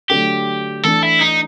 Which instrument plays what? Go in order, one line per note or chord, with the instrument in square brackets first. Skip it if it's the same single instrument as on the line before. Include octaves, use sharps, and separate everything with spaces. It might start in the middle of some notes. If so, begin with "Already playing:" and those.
[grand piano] D3 F#3 A3 D4 [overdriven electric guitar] G4
[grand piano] E3 A3 D4 [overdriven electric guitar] A4
[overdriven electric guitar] E4
D#4